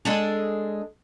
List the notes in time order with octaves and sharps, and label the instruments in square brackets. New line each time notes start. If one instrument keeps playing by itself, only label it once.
[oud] G#3 D4 A4